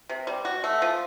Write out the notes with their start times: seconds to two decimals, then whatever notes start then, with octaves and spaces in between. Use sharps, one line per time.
0.09 C3
0.27 G3
0.45 F#4
0.64 A3
0.82 F3